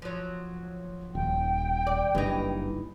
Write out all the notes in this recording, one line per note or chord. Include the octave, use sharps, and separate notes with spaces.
F3 F#3
D#1 G5
D5
F#1 G2 E3 D#4